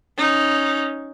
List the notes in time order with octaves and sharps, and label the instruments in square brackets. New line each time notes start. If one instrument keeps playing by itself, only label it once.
[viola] C#4 D#4